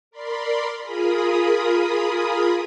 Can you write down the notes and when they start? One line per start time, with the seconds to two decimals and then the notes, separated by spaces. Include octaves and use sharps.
0.11 A#4 D5 B5 C6
0.81 F4 G#4 A#4 B5 D#6